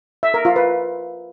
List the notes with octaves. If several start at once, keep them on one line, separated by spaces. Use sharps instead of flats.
E5
A#4
F4
B4